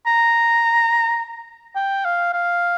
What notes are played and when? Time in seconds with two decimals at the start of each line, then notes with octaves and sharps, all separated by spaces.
0.06 A#5
1.76 G5
2.05 F5
2.33 F5